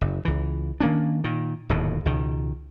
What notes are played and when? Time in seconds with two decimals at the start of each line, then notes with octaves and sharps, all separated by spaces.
0.01 F#1
0.25 C#2 E3
0.81 D#3 A#3 C#4 D4
1.24 A#2 D#3
1.69 D1 D#2 G#2 B2
2.05 C#2 B2 D#3